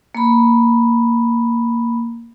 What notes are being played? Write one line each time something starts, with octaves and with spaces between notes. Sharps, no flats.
A#3 B5